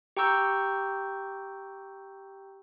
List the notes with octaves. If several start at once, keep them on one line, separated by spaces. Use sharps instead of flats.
G4 G5 A#5 C#6 E6 G6